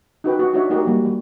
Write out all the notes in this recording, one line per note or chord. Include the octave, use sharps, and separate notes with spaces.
D#4 F#4 B4 G5
F#4
D4 D#4 F#4 C#5 D5 E5
A3 D#4 F#4 G4 A#4
G3 A#3
G3